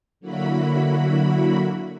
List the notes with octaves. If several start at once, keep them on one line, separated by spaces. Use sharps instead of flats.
D3 F#3 A#3 E4 F#4 B5